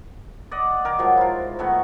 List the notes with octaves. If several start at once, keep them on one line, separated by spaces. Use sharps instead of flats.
D5 D#5 F#5
D#3 A#4 D6
G#2 F3 F#3 F#4
E4 F4
D#3 A3 B3 F#4